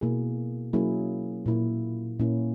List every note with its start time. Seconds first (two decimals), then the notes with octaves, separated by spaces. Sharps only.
0.01 B2 A#3 E4 G#4
0.73 F#3 A#3 C#4 E4 G#4
1.46 A#2 A#3 E4
2.19 A#2 A#3 C#4 E4